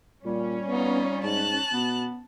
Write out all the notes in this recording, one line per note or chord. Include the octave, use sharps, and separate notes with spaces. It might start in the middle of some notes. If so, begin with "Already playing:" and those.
A#2 G3 C#4
B3 D#4 F4
G#2 A5 F#6
B2 B3